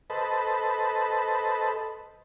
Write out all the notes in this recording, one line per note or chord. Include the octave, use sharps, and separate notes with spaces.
A4 B4 C5 D#5 A5 B5